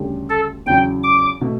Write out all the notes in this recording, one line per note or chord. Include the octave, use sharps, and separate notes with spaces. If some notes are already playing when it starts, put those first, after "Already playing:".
Already playing: D2 C#3 G3 D4 G4
A4
E2 C#3 F#3 G5
D6
B2 A3